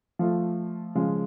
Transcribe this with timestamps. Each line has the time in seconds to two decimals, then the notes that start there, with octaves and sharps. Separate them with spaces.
0.19 F3 A3 F4
0.95 C#3 F3 G#3